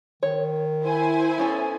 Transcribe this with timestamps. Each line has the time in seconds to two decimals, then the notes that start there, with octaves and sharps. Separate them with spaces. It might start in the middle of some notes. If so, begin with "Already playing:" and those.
0.23 D#3 C#5
0.84 E4 C5 G#5
1.38 B3 C#4 A4